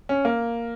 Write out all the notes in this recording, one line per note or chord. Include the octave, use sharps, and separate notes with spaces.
C#4
A#3